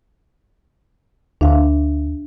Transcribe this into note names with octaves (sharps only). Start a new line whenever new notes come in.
D2 D4 E5 F5